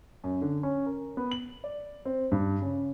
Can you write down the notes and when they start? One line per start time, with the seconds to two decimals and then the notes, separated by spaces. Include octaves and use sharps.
0.24 F#2
0.42 D3
0.63 C#4
0.86 A#4
1.17 B3
1.31 F#7
1.64 D5
2.05 C4
2.32 G2
2.62 C#3